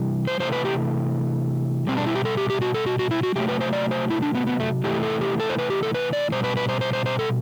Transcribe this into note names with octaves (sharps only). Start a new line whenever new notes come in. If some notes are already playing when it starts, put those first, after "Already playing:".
Already playing: C3 E3 G3
C5
C3 E3 A3 C5
B4
G4
B2 G3 C4
D4
E4
G4
A4
G4
G4
F#4
A4
F#4
F#4
E4
F#4
C3 F#3 A3 G4
B4
C5
D5
C5
E4
D4
B3
B3
A3
C3 E3 A3 G4
A4
G4
A4
C5
B4
G4
A4
B4
D5
B2 G3 C5
B4
B4
C5
C5
C5
C5
A4